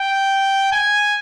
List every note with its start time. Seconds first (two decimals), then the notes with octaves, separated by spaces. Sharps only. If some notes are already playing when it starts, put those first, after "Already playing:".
Already playing: G5
0.72 G#5